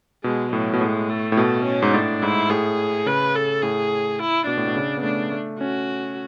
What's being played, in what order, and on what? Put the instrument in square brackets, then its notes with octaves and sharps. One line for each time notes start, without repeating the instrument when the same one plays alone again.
[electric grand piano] B2 [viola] G#3
[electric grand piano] A2 [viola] F#3
[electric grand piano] B2
[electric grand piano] A2 [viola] G#3
[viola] A3
[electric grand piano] A2
[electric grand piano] B2 [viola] A3
[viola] C#4
[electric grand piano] G#2
[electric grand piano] A2 [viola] D4
[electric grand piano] G#2 [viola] E4
[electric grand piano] A2 [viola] G#4
[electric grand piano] C#3 [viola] B4
[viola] A4
[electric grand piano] A2 [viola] G#4
[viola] E4
[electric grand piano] B2 [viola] D4
[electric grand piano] A2
B2
C#3
B3
[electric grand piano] A3 [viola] D4
[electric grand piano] A3
[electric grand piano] C#4 [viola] F#4